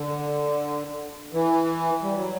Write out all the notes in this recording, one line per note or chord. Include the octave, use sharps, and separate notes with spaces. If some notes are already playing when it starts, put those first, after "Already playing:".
Already playing: D3
E3
G3
F#3